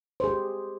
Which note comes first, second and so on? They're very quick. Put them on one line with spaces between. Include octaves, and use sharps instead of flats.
C5 G#4 G4